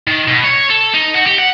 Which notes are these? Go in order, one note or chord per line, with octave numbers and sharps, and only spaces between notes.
D#3
B2
C#5
A4
D#4
F#4
G4
F#5